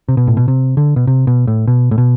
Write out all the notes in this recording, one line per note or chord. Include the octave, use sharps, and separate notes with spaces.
C3
B2
A2
B2
C3
D3
B2
C3
B2
A2
B2
A2
B2